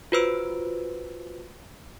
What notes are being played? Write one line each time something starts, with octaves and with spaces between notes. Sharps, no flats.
F4 F#4 B4 C5 E6 D7